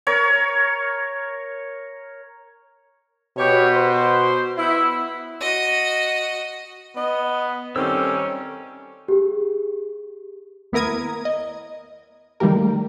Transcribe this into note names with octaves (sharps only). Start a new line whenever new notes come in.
A#4 C#5
B2 G4 C#5
C5
B3 E4
F#4 D#5
B3 D#5
D#3 G3 C4 C#4 A4 C#5 E6
G4 G#4
D#2 B3 E4 A#4 D#6 G#6
D#5
D#3 G3 A3 A#3 G4 A#4